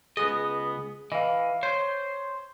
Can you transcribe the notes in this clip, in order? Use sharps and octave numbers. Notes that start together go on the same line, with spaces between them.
C#2 B3 G#4 D#5
E3 D#5 F5
C5 C#5